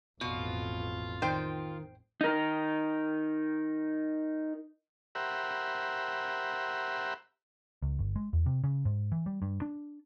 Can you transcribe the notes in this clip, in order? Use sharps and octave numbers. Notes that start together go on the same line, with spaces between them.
A1 F2 B2 F4
D#3 C5 G5
D#4 A#4
G4 A#4 C5 E5 F#5 B5
C#2
G1
G#3
E2
C3
C#3
G#2
E3
G3
G2
D4